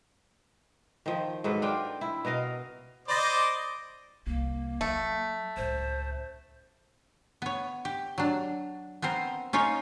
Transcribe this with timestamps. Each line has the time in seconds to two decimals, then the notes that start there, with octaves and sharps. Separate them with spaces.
1.06 D#3 F3
1.44 G#2 F#3 A4 B4
1.62 D4 F4 G5
2.01 E4
2.25 B2 A#4 D#5 F5
3.08 C5 D5 D#5 B5 D6 A6 A#6
4.27 C2 C3 A#3
4.81 F#3 A3
5.57 C#2 A2 C5
7.42 B3 C#5
7.85 G4
8.18 F#3 D4
9.02 B3 C4 A#4 C5
9.53 C#4 D#4 F4 C#5